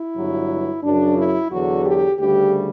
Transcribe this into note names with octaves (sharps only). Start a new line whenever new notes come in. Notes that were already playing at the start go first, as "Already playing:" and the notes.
Already playing: E4
G1 G2 F#3
F#2 C#3 F#3 D4
E4
E2 D3 F#3 F#4
G4
D2 C#3 G3 G4